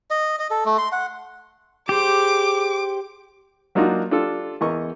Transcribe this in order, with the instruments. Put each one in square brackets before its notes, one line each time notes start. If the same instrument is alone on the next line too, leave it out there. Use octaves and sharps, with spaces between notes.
[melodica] D#5
D#5
A4
A3
C6
F#5
[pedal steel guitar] G4 C5 [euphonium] G#4 [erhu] D6
[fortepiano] F#3 A#3 D4 D#4 F4 F#4
D4 F4 G4 A4
E2 A#4 D#5 C#6